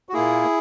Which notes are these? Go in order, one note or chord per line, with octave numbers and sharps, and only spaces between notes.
F#4
A#2 A#3 E4 G#4